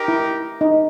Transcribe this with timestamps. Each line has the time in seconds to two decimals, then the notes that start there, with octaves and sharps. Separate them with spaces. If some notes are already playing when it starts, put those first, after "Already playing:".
Already playing: D#4 G4 A#4
0.08 E4
0.61 D#4